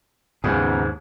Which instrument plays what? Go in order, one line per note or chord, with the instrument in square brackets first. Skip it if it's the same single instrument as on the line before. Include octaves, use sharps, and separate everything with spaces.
[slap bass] D#2 G#2 [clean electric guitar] C#3 B3 G#4